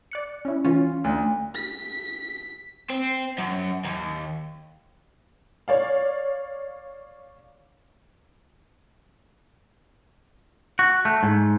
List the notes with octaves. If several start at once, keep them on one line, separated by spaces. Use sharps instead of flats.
D5 F#6 C#7
C#4 E4
E3 C#4 F4
D2
B6
C4
F#2
D#2
C#5 D5 F5
F#4
A3
G#2